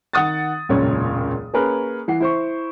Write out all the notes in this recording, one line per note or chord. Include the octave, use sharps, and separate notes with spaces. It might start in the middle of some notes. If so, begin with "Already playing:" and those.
D#3 F#5 D#6 A6
E1 C#2 F#2 A#2 C#5
A#3 C#4 G#4 A#4 B4
E3 F#5 C7
E4 C5 C#6